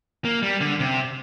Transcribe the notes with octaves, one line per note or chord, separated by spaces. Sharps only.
A#3
G3
D3
C3